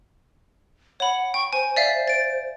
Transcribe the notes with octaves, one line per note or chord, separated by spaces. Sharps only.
C#5 F#5 B5
G5 C#6
C5 G#5
D5 E5 F5
A6 D7